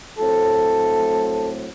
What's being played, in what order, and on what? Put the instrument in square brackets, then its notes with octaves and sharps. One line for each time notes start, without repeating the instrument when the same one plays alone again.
[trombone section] A2 F#3 A3 C4 A4